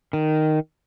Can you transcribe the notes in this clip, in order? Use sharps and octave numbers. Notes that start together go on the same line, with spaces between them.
D#3